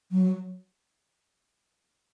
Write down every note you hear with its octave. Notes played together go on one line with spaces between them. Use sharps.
F#3